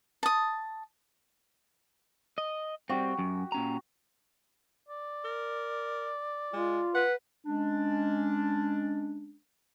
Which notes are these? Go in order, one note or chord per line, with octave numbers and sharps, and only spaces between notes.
A5 D#6
D#5
G3 C4 F#4 G4
F#2
A#2 C#4 A#5
D5
A#4
G#3 F4
B4 F#5
G#3 C#4 D4